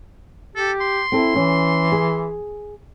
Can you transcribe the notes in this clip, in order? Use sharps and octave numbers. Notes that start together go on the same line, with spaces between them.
G4 A4
C6
C4 E4 A4
E3 C#4
G#4